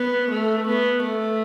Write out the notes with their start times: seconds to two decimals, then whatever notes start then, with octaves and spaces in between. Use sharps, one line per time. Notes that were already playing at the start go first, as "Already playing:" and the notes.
Already playing: B3
0.30 A3
0.66 B3
1.02 A3